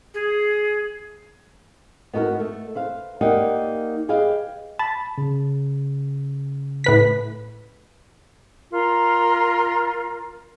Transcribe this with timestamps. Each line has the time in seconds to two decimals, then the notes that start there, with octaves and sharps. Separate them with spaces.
0.14 G#4
2.13 B3 D#4 F#4 A4 A#4
2.40 A3
2.75 B4 C5 F5
3.21 A#3 D#4 G4 D5 F#5
4.09 G4 G#4 B4 D#5 F5
4.79 A5 B5
5.18 C#3
6.84 A2 B4 B6
8.71 F4 A#4